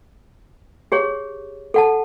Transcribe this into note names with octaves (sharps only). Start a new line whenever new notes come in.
G4 G#4 C#5
A4 F#5 A5